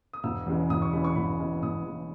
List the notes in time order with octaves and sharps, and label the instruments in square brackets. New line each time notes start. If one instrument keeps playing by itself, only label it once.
[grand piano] D#6
E1 E6
E2 C#3 G#3
E1 D#6
C#6
E2 C#3 G#3 B5
C#6
E1 B5
E2 C#3 G#3
E1 D#6
E2 C#3 G#3